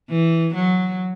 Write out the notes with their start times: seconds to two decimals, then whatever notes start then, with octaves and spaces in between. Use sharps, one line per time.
0.10 E3
0.54 F#3